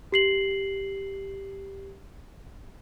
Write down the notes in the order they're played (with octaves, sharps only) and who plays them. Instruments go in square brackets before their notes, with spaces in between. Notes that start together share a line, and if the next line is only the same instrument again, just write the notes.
[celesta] G4 C7 F#7